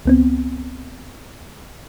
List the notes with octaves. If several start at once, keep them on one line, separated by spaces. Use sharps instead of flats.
C#2 B3 C4